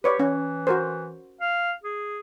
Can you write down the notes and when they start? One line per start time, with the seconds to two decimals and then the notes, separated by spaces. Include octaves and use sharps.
0.04 G4 B4 C#5 D5
0.20 E3 C#4
0.67 F#4 A#4 C5
1.41 F5
1.83 G#4